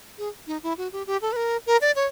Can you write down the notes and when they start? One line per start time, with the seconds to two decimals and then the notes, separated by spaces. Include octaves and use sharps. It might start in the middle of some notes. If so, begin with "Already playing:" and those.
0.18 G#4
0.47 D#4
0.63 E4
0.78 F#4
0.92 G4
1.07 G4
1.22 A4
1.32 B4
1.36 A#4
1.66 A#4
1.81 D5
1.96 C#5